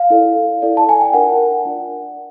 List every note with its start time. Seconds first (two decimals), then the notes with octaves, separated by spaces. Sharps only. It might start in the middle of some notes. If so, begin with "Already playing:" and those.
Already playing: F5
0.10 E4 A4 D5
0.62 E4 A4 D5
0.77 A5
0.89 G#5
1.01 G5
1.13 D4 F4 A#4 D5 F#5
1.65 D4 F4 A#4 D5